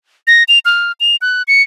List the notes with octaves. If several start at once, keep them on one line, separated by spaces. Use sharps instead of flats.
A#6
F7
F6
F7
F#6
C#7